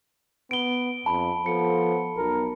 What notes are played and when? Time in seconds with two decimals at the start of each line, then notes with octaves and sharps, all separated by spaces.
0.51 B3 D7 G7
1.06 F2 A5 B5
1.46 F3 B3 A4 C5 C#7
2.17 B1 A#4